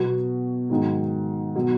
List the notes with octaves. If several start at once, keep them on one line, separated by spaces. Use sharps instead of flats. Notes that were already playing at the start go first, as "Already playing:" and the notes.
Already playing: B2 F#3 B3 F#4
G#2 D#3 F#3
B2 F#3